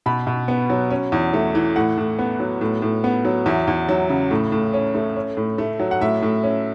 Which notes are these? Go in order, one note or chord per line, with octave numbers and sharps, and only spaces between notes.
B2 B5
B2
B3
F#3
C#4
E2
A3
E3
A2 F#5
A2
B3
F#3
A2
A2
B3
F#3
E2 E5
E2
F#3
C#3
A2
A2
C#4
A3
C#4
A2
A3
F#3
F#5
A2 E5
A2
C#4